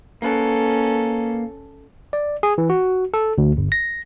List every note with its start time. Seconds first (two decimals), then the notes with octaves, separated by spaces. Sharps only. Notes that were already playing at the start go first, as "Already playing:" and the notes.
0.22 A#3 C#4 A4 B4
2.13 D5
2.43 G#4
2.58 E3
2.70 F#4
3.14 A4
3.38 D2
3.57 G1
3.72 A#6